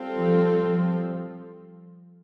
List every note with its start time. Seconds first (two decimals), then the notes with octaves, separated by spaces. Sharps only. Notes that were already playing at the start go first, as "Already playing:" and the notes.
Already playing: G3 C4 F4 A4
0.17 F3
0.62 F3